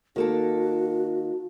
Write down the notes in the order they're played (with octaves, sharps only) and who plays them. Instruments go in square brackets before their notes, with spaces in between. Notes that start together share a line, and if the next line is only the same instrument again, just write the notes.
[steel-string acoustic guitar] D#3 A#3 A4 [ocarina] F#4